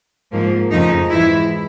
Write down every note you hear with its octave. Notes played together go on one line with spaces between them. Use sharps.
G#2 F3 A#3
F2 C#3 F3 A3 D#4
G#2 E3 G#3 E4